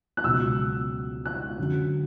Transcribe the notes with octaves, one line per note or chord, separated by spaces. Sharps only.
F#6
C#2 B2 F#3 E6
F#6
F#2 D3 F#3